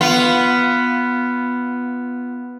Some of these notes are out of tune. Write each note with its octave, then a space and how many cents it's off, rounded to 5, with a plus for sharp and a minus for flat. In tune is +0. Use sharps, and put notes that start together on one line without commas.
B3 +0 F4 -10